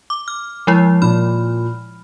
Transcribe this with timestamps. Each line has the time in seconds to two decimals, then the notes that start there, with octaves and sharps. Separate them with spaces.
0.10 D6
0.28 F6
0.67 F3 G#3 E4
1.02 A#2 B5 F6